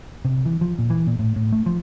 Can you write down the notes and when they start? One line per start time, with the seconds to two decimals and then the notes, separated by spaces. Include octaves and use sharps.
0.25 C3
0.45 E3
0.61 F3
0.79 A#2
0.90 E3
1.07 A#2
1.19 A2
1.36 A2
1.52 A3
1.66 F3